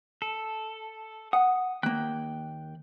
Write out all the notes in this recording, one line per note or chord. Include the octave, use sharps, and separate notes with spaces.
A4
F#5 D#6
D#2 A#3 G5 F#6